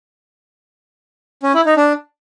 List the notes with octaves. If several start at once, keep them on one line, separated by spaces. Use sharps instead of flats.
C#4
E4
D#4
D4